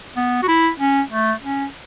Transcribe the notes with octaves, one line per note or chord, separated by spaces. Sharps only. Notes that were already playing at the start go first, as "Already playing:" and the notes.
B3
F#4
E4
C#4
A3
C#4